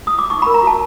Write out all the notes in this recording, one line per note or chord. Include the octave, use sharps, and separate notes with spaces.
D#6
D6
D#4 C#6
B5
A#4
A#5
F#4 A5